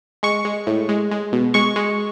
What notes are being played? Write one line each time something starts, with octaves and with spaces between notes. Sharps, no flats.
G#3 C#6
G#3
A2
G#3
G#3
B2
G#3 C#6
G#3